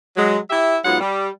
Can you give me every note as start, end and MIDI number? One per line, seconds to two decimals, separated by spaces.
0.17 0.38 54
0.17 0.38 56
0.50 0.77 64
0.50 0.77 67
0.50 0.77 76
0.85 0.99 44
0.85 0.99 54
0.85 0.99 59
0.85 0.99 65
0.85 0.99 78
1.00 1.28 55